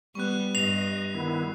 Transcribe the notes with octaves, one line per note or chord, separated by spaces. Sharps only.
G3 B3 C#6 F#6
G2 D#5 C7 F7
D#3 G3 B3 E4